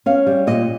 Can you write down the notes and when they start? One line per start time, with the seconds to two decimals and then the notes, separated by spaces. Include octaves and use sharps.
0.06 C#4 F5
0.27 G3
0.47 A#2 D#5